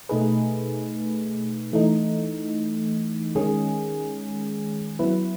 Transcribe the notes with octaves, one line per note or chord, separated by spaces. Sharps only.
B2 A3 D#4 G#4 B4
E3 A3 D#4
D#3 G#3 C#4 G#4
F#3 B3 E4 B4